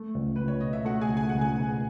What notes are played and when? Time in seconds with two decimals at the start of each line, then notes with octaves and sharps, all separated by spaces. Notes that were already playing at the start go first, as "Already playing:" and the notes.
Already playing: A3
0.15 C#2
0.36 C#2 B4
0.48 C#5
0.61 B2 D#5
0.73 E5
0.85 A3 F#4 F#5
1.01 G#4 G#5
1.09 C#2
1.17 G#5
1.29 C#2 F#5
1.41 G#4 G#5
1.56 B2